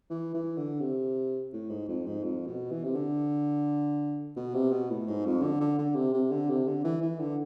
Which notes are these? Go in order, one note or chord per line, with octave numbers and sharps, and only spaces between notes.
E3
E3
D3
C3
A2
G#2
F2
G#2
F2
B2
E3
C3
D3
B2
C3
B2
A2
G#2
F2
D3
D3
D3
C3
C3
D3
C3
D3
E3
E3
D3